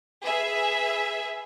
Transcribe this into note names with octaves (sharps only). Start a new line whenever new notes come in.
G#4 B4 E5